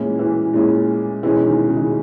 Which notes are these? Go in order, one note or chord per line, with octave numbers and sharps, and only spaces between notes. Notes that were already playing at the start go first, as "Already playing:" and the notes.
Already playing: A#2 E3 G#3 C#4 E4
E3
A#2 G#3 C#4 E4
B2 E3 G#3 C#4
D#3
C#3
D#3
C#3